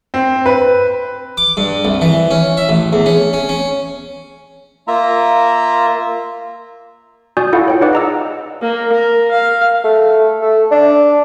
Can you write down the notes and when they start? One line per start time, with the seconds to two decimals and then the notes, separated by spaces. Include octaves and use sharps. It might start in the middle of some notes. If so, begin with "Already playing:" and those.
0.14 C4
0.46 B4
1.37 D6
1.57 G2
1.85 C2
2.01 E3
2.31 C#4
2.57 E5
2.69 A1
2.93 E2
3.06 C#4
3.33 C#4
3.49 C#4
4.88 A#3 F4 E5 A#5
7.37 F#4 D5 G#5 C#6 D#6 G6
7.53 E4 F4 A4 F5 F#5
7.68 C#5 G5
7.81 D#4 G#4 B4 D5 F#5 D6
7.93 D#5 A#5 E6
8.62 A#3
8.93 A#4
9.31 F5
9.84 A3
10.41 A3
10.71 D4